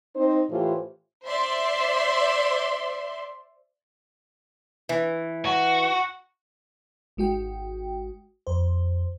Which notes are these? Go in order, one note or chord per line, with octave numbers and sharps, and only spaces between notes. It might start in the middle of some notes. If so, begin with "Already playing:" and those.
C4 D#4 C5
A2 E3 F4 G4 C5
C5 D5 E5 C6
E3
F#4
G#1 G#3 F#4 G5
F2 C5